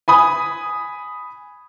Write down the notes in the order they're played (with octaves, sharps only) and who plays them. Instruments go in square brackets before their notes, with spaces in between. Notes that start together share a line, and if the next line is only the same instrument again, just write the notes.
[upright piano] G#5 B5 D#6